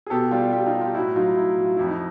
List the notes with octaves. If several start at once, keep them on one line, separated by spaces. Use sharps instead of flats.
G#4
B2 G4 A4
G3 F4 G4
B2 F4 G4
D#4 F4
G3
F4 G4
A2 E4 F#4
F#3 D#4 F4
A2 E4
F#3
F4
F2 E4
D#4